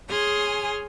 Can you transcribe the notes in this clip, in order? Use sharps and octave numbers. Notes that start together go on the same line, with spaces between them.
G#4 C#5 G#5 C6 D#6 F6